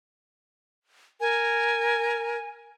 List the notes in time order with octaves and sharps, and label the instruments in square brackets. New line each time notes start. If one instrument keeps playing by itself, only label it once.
[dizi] A#4 [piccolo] G#5